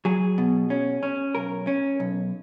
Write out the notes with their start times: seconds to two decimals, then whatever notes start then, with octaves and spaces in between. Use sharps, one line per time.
0.05 F#3 G#4
0.38 B2
0.70 C#4
1.03 C#4
1.35 B1 A#4
1.67 C#4
2.00 B1